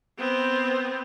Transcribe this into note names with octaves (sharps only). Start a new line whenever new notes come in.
B3 C4